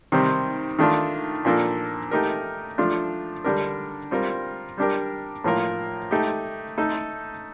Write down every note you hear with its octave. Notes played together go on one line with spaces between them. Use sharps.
C3 D#3 G3 C4
D#3 A3 D4 F4
A#2 F3 A#3 D4 A4
A3 D#4 G4 A#4
F3 A3 D4 F4
D3 G3 D4 G4 A#4
G3 C4 F4 A#4
G3 D4 G4 A#4
A2 F3 A#3 F4 A#4
A3 D#4 G4
A3 D#4 A4